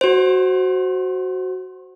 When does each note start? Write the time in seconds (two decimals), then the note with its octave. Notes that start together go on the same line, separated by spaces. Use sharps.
0.01 F#4 C5